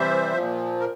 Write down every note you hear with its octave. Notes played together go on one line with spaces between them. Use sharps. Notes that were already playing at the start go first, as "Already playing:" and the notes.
Already playing: C3 E3 G3 C5 E5
F3
A#2
A#4